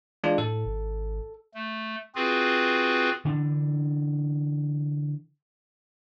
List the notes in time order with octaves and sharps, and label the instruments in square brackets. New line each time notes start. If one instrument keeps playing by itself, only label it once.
[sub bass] E3 [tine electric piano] G#3 D4 F4
[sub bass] A2 [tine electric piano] A4
[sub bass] G#1
[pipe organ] A3
C4 F4 F#4 G#4 B4
[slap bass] D3 E3 D4